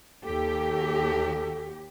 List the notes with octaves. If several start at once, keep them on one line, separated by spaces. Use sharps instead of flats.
D#2 G4 A4